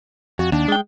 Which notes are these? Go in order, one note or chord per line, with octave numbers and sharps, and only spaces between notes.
F2 F#4
D#2 D4
G#3 G5